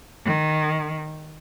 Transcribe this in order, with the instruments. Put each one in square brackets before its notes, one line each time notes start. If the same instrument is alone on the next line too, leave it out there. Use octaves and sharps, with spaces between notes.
[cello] D#3